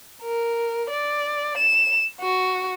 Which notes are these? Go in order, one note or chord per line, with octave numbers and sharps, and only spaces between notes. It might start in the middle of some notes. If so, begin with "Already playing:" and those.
A#4
D5
E7
F#4